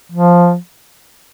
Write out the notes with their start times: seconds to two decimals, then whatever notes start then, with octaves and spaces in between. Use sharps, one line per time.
0.12 F3